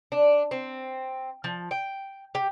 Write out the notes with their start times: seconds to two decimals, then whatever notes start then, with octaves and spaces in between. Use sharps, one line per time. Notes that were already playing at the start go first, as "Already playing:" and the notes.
0.12 D4
0.51 C4
1.44 F3
1.71 G5
2.35 G4